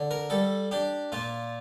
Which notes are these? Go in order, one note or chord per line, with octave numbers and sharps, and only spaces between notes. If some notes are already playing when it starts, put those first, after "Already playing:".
Already playing: D3
A#4
G3 A4
D4 G4
A#2 F4